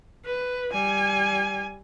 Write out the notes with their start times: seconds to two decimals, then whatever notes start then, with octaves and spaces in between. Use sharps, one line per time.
0.25 B4
0.72 G3 G#5